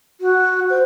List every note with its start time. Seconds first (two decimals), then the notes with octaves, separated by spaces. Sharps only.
0.21 F#4
0.70 C5